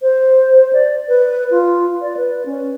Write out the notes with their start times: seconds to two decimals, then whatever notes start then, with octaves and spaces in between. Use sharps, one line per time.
0.02 C5
0.73 D5
1.08 B4
1.50 F4
2.01 D5
2.17 B4
2.46 C#4